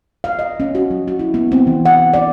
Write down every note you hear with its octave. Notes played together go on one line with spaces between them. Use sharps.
F5
D#5
C#4
F#4
F#3
F#4
E4
B3
C4
E3
F#5
D5